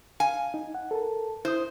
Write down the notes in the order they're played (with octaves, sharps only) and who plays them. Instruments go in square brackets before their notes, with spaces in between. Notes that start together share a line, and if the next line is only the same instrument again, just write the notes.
[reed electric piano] F5 [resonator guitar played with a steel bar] G#5
[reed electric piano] D#4
F#5
A4 A#4 A5
[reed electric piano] E4 D#6 [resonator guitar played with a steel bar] C5